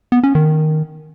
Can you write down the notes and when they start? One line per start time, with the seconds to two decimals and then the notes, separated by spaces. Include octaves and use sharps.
0.12 B3
0.23 C#4
0.35 D#3